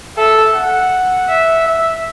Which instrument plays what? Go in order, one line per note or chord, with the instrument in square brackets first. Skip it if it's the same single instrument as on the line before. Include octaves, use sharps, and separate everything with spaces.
[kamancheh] A4 [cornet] E5
[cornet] F#5
[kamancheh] E5
[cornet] E5